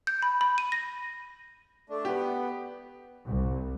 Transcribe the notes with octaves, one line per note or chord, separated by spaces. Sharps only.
G6
B5
B5
D#7
A#6
A3 D4
B3 G4 B4
C2